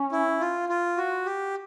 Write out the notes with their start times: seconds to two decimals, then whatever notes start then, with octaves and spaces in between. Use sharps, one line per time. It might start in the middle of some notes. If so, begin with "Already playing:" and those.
Already playing: C#4
0.12 E4
0.40 F4
0.69 F4
0.97 F#4
1.26 G4